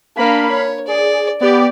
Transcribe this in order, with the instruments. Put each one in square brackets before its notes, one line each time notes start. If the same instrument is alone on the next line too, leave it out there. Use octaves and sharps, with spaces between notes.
[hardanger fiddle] A#3 D4 [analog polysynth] F5 B5
[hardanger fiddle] C#5
[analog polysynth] G#4 [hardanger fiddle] D5
[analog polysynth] B3 G4 D6 [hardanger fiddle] D5